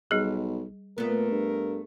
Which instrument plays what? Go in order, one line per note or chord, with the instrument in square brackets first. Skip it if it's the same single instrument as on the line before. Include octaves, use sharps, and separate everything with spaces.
[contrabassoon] B1 [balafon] G3 G#4
[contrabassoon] A#2 [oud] A3 B3 [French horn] A#4
[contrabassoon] G2